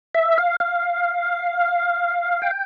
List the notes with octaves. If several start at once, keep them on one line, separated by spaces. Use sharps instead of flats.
E5
F5
F5
G5